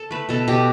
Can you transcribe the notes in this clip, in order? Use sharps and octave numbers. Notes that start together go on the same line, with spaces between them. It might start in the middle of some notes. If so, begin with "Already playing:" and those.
Already playing: A4
A3 B4
B2 A4
B2 G4